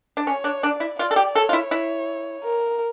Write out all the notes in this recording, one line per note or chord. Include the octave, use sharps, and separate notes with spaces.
D4
C#4 C#5
D4
D4 D5
E4
F4 D5
A4
G4
A4 C#5
F4
E4
E4
A#4